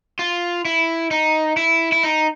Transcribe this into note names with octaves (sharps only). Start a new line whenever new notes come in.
F4
E4
D#4
E4
E4
D#4